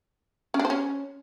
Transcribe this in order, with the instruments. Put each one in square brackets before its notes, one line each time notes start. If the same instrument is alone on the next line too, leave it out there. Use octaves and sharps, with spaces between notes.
[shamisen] C#4
D4
C5
C#4